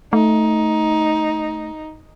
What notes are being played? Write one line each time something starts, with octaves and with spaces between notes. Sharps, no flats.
A3 D#4